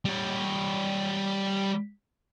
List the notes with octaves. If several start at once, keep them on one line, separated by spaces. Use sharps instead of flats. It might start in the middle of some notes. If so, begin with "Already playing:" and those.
G3 C#5